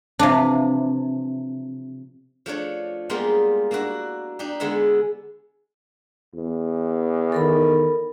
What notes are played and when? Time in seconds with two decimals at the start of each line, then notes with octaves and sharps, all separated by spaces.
0.19 C3 E3 F3 D4
2.46 F3 A3 D4 C#5
3.10 G3 G#3 A#3 B3 D#4 F4
3.71 A#3 D4 E4 F#4
4.39 D4 D#4 G4
4.60 D3 G#3 B3 E4 E5
6.34 E2
7.32 D#3 A4 A#4 B5